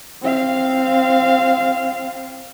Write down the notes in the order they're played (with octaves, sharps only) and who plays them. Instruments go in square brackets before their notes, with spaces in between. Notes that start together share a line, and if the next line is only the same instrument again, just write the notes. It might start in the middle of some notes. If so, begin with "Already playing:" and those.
[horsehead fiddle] C4 F5